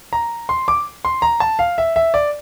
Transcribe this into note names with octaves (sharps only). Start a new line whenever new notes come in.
A#5
C6
D6
C6
A#5
A5
F5
E5
E5
D5